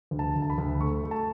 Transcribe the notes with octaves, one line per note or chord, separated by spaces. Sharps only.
D2
A5
D2
A5
B5
D2
A3 C#6
A3
A5